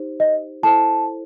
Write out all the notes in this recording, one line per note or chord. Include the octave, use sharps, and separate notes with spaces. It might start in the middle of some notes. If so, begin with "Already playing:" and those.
Already playing: D#4 G4 C5
D#5
E4 A4 C5 A5